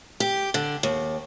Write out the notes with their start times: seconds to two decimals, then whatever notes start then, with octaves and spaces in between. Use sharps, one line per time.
0.20 G4
0.54 D3
0.83 D#2